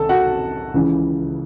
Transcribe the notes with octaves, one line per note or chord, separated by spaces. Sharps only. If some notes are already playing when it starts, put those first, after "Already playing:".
Already playing: C2 D#3 A4 A5
F#4 F#5
C#2 C#3 E3